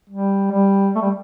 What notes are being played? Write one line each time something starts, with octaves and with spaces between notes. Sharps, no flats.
G3
G3
A3
G3